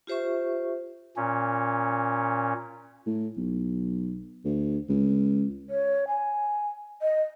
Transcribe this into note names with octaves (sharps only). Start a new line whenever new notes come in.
F4 G4 C5 E5 C#6
A#2 C#4
A2
B1
D2
C#2
C#5
G#5
D#5